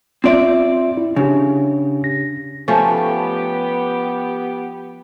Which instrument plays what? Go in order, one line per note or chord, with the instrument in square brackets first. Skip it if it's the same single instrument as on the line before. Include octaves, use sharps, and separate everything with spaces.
[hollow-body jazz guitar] C4 D5 [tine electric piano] F4 E5
[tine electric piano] E4
[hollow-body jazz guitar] C#3 [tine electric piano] D4 G4
[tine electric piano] A#6
[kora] F3 A3 C#4 [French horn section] B3 G4